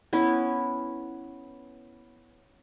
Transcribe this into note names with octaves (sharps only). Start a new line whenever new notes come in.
B3 C#4 E4